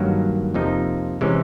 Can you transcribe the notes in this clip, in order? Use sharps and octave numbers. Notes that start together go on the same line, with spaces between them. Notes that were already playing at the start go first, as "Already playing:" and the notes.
Already playing: G2 D#3 F#3 A#3
F2 C3 F3 A#3 D#4
C3 E3 G#3 C#4